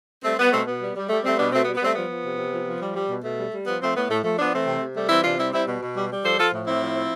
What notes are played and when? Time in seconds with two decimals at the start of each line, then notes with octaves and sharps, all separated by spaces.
0.24 G3 A3 C4
0.37 G3 B3
0.51 B2 A3 C4
0.66 B2 B3
0.81 G3
0.95 G3
1.09 G3 A3
1.23 G3 A3 C4
1.37 B2 B3 D4
1.52 B2 A3 C4
1.63 B3
1.66 G3
1.74 B3
1.81 G3 A3 C4
1.95 F3 B3
2.09 F3
2.24 C3
2.38 C3
2.52 F3
2.66 F3
2.81 G3
2.95 G3
3.09 B2
3.23 B2 A3
3.38 G3
3.52 G3
3.66 F3 B3
3.81 F3 A3 C4
3.95 A2 B3
4.09 A2 A3
4.23 F3 A3
4.38 F3 B3 D4
4.52 E3 A3 C4
4.66 C3
4.81 C3
4.95 G3 A3
5.09 E3 C4 E4
5.24 C3 D4 F4
5.37 G3 C4 E4
5.52 G3 C4 E4
5.67 B2
5.80 B2
5.95 G3
6.09 G3
6.24 F3 A4 C5
6.38 F3 F4 A4
6.52 A2
6.66 A2 C4 E4
6.81 F3
6.95 F3